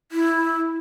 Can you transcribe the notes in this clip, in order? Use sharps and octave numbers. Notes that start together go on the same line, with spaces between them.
E4